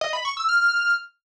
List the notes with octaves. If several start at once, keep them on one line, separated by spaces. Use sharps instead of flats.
D#5
B5
C#6
E6
F6